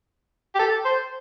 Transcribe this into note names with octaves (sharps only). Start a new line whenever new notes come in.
G4
A4
C5